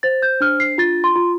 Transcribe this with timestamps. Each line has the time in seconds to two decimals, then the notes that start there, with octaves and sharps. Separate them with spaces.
0.03 C5 A6
0.22 G6
0.41 D4 F6
0.60 C7
0.78 F4 A6
1.04 C6
1.16 F4